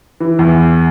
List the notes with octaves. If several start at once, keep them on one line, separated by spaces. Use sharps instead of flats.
E3
E2